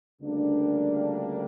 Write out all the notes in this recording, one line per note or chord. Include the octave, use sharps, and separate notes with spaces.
D2 C#3 G3 A#3 D4